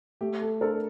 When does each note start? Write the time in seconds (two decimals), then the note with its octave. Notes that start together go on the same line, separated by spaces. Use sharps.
0.21 A3 G4
0.42 A4
0.61 D4 A4 A#4 C5